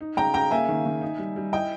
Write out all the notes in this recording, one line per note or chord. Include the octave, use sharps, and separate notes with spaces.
D#4
C#3 G5 A#5
C#3 G5 A#5
A#3 E5 G#5
D#3
D#3
D#4
G3
G3
E4 D#5 G5